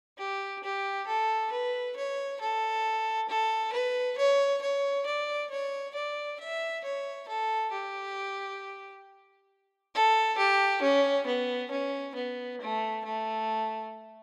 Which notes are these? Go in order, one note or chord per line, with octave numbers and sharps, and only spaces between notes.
G4
G4
A4
B4
C#5
A4
A4
B4
C#5
C#5
D5
C#5
D5
E5
C#5
A4
G4
A4
G4
C#4
B3
C#4
B3
A3
A3